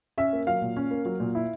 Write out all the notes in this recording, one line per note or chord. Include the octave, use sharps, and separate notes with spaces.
C#4 E5
A#3
F#3 F5
A#2
C#4
A#3
F#3
A#2
E4